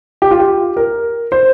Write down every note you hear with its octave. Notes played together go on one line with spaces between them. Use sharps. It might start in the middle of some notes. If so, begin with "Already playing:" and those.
G4
F4
G4
A#4
C5